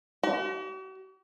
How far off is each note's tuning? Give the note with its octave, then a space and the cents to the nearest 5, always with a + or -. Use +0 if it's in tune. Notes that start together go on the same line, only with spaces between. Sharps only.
F#4 +45